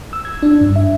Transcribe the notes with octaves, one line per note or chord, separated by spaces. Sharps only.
E6
G#6
D4
G2
E5